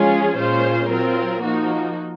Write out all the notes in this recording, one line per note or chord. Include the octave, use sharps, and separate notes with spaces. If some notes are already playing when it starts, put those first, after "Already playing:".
Already playing: F3 G#3 C#4 F4 G#4
A#2 G#3 C#4 F4 C5
F#3 C4 F4 A#4
F3 A#3 D#4 F#4